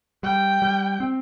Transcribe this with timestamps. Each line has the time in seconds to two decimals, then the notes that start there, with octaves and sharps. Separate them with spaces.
0.23 G3 G5
0.62 G3
1.00 C4